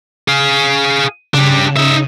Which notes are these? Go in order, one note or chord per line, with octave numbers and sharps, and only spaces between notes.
G#4 F5
C#3 D4 G4
D#4 E5